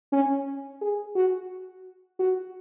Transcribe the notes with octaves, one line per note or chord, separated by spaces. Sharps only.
C#4
G#4
F#4
F#4